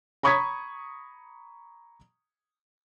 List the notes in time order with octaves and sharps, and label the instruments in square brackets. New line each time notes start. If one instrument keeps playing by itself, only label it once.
[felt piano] A#5 B5 C#6 D#6 G#6 B6